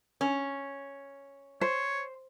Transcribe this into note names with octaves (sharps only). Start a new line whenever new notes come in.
C#4
C5 C#5